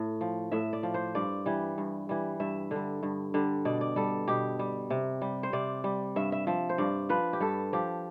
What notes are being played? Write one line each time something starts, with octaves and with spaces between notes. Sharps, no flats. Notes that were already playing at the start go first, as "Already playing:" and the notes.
Already playing: A2
F3
A2 E5
D5
F3
C5
G2 D5
E3 G3
G2
E3 G3
G2 E5
D3 G3
G2
D3 G3
B2 D5
D5
G3 A4
B2 G4
G3
C3
G3
C5
C3 D5
G3
G2 E5
E5
F3 E5
C5
G2 D5
F3 B4
G4
G2 A4
F3 G4